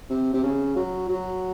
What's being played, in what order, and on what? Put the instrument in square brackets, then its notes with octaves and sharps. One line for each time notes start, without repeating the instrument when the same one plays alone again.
[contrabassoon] C3
C3
C#3
F#3
F#3